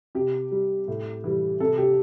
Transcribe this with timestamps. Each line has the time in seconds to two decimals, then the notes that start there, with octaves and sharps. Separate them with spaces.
0.15 C3 G4
0.51 G3
0.88 A2
1.24 E3 G3
1.60 C3 A4
1.78 G4